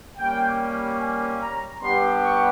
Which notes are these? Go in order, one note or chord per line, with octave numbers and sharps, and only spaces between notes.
G3 A#3 C#4 G5
G#5
A#5
G3 B3 D4 G4 C6
C#6